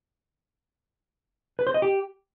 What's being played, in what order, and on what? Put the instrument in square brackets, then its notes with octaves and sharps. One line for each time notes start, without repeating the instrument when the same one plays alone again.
[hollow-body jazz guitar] B4
C5
D#5
G4